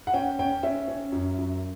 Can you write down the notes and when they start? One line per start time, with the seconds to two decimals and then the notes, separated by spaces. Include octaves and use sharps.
0.07 F#5
0.14 C#4 G5
0.39 C#4 G5
0.63 C#4 E5
0.88 C#4
1.12 F#2
1.38 F#2